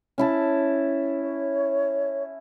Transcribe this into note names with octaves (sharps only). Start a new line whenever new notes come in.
C#4 E4 A5
C#5